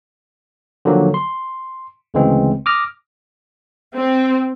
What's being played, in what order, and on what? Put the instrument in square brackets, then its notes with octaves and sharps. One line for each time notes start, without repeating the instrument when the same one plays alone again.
[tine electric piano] D3 D#3 F3 F#3 A#3
C6
D2 C#3 E3 G#3 C4
D6 D#6 F6 A#6
[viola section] C4